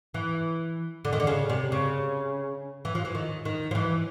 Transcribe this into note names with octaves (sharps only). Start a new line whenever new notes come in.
E3
D3
D#3
D3
C#3
C3
C#3
E3
F3
E3
D#3
D#3
F3
E3